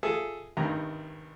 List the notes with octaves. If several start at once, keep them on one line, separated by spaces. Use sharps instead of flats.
F4 G#4 A4 E5
G#1 G2 C3 D#3 A#5